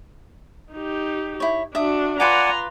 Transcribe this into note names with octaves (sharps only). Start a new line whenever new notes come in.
D#4 G4
E4 C#5
D4 F#4 E5 D#6
F4 B4 D5 F#5 G#5 A#5 C6 D6